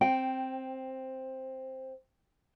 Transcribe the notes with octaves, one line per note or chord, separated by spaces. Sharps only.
C4 G5